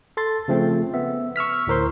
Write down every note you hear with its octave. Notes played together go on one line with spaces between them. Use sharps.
A4 C6 A6
C#3 F3 A3 C4
B3 E5
C#6 E6 F6 B6
D2 A2 A#4 C5 C6